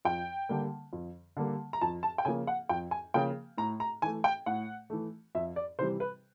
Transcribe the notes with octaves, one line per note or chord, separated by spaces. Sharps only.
F2 G5
D3 G3 A#3
F2
D3 G3 A#3
A#5
F2 A5
A5
G5
C#3 F3 A#3 G#5
F#5
F2 G5
G#5
C#3 F3 A#3 G5
A2 A#5
A#5
E3 A3 G#5
G5
A2 F#5
E3 A3
F2 E5
D5
C3 E3 G3 C5
B4